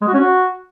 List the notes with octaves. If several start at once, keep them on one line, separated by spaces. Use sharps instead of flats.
G#3
F#4
C#4
F#4